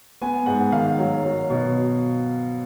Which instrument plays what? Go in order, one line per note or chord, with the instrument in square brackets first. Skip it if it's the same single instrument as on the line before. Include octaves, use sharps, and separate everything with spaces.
[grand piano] B3 G#5
G#2 F#5
D#3 F5
F#3
F#3
B2